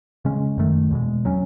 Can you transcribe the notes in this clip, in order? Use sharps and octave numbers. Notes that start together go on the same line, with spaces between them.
C#3 G#3 C#4
F#2 D#3 A3
E2 B2 G#3
F#3 A3 C#4